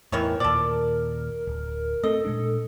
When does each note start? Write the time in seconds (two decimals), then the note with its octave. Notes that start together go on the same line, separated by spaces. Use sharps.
0.12 E2 A2 D#3 E3 A#4 C#5
0.40 D#2 A#2 A4 D5
1.47 D1
2.04 A3 C4 A4 D#5
2.25 A#2 G#3 D4